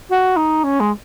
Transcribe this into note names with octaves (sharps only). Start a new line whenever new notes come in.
F#4
D#4
C#4
G#3